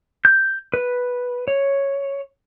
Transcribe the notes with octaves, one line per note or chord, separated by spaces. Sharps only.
G6
B4
C#5